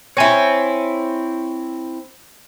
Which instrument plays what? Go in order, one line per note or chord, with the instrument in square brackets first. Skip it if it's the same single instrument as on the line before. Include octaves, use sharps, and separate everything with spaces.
[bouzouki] C4 E4 [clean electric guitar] C#5 G#5